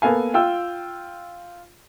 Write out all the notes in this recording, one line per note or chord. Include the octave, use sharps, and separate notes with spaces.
A#3 B3 A4 F5 G#5
F4 G5 E6